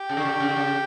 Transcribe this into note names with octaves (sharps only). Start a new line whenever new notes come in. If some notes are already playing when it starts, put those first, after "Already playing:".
Already playing: G4
C#3
D3
C#3
D3
C#3
D3
C#3